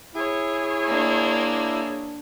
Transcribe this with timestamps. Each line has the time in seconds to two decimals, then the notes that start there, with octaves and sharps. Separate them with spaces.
0.15 E4 G#4 C#5
0.87 A#3 D4